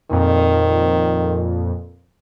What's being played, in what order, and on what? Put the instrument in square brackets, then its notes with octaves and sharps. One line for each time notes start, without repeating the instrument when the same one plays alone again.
[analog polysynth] F2 A#2 [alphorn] D#3